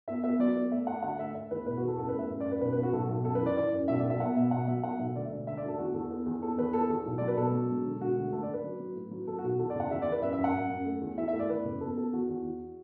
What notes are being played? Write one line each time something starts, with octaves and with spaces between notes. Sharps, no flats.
B3 E5
B3 E5
F#3 D5
B3
A3 E5
A3 F#5
D2 F#5
A3 E5
A3 E5
E2 B4
B2 B4
F#4
E2 A4
F#2 A4
B4
A3 E5
F#2
D5
F#2
B4
B1 B4
B4
B1
F#4
B1 A4
B1
F#2 A4
B4
E3
D5
E3 D5
F#2
B1 E5
B1 D5
E5
B3 F#5
B2 E5
B2 F#5
F#3 E5
B3 F#5
B1 E5
D2 D5
E5
E1
D3 E5
D5
D2
A4
E2 F#4
E2 A4
B3
E2
B3 A4
E2 B4
B3 A4
E2 A4
B1
F#3 D5
B4
B2 A4
F#3
E1
D3
E1 F#4
D2
A3 A4
D5
D3
B4
F#3
F#3
A2
F#3
F#3 A4
F#4
B1
F#4
E2 A4
D5
F#1 F#5
E2 E5
D5
E2
B4
F#2 E5
E5
F#2
F#5
F#2
F#2
A3
E2
E3 E5
E5
A3
D5
E2 B4
F#1
B3 A4
B3 A4
E2 F#4
E2
E2